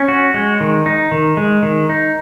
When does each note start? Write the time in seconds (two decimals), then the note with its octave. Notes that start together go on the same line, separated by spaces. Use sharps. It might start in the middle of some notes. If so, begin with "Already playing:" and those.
Already playing: C#4
0.08 F#4
0.34 G#3
0.61 D#3
0.86 D#4
1.12 D#3
1.37 G#3
1.62 D#3
1.89 D#4